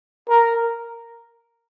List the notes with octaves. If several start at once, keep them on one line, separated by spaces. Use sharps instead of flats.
A#4